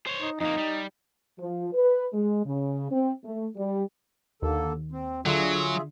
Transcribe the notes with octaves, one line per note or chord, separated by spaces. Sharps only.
C5 C#5
D#4
F2 A#3 D#4
G3
F3
B4
G#3
C#3
C4
A3
G3
D#2 D3 A#3 A4
C4
D3 F#3 F4 G#4 E5